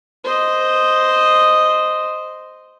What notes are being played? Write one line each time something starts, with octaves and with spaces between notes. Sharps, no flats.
C5 D#5